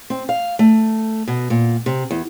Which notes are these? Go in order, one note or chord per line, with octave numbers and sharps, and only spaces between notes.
C4
F5
A3
B2
A#2
C3
E2